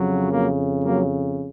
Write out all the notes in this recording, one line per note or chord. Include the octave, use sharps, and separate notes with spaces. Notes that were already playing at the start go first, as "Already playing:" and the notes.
Already playing: F2 C#3 F#3
F#3 A#3
F#3 A#3